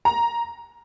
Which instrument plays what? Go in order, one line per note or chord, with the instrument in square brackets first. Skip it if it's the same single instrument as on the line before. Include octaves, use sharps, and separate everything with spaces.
[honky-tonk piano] A#5